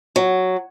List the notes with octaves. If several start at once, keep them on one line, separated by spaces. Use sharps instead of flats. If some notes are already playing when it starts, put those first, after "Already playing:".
F#3